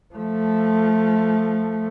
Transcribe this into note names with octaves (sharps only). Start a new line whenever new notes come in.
F3 A3